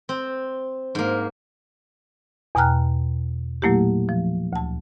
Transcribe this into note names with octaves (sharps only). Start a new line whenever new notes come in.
C4
G#2 A#3
E2 B2 G5 A#5 F6 F#6
A#2 F#3 A3 A#3 E4 G4
F3
D2 A5